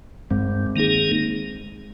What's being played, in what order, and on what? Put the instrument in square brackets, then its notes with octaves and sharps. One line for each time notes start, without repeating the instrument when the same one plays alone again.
[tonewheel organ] G2 [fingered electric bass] G#3 C4
[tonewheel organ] D#3 A#3 D#4 G#4